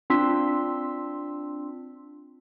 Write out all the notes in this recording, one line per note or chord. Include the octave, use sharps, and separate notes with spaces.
C4 D4 F4 C6 E6 B6